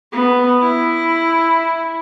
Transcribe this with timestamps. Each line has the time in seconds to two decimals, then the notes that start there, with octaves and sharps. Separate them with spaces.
0.12 B3
0.61 E4